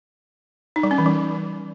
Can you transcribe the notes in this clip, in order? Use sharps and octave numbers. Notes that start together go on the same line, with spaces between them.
D#4
G3
C#4
E3
G3